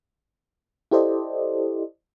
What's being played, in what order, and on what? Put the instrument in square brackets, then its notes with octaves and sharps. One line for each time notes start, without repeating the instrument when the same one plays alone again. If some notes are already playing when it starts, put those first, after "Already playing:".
[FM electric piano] E4 G4 A4 C5 D5 D#5